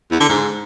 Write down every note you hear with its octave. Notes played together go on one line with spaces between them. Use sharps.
E2
D3
G#2